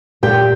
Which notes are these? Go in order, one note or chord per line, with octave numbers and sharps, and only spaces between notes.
A#2 G4 G5